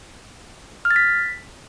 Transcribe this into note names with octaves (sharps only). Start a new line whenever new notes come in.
F6
A6
B6